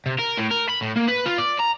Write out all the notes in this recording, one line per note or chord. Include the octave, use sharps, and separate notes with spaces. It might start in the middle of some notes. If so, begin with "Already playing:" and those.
C3
A#4
A2
A#4
B5
A2
A#3
B4
F4
D5
A#5